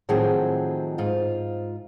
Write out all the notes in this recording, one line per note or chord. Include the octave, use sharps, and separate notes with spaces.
A2 D#3 F3 F#3 C4 G#4
G#2 F4